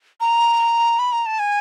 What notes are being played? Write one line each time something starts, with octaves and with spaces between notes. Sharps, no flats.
A#5
B5
A#5
A5
G#5